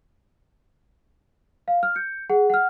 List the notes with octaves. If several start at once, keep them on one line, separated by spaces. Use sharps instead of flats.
F5
F6
G6 C#7
G#4 F#5
F#5 F6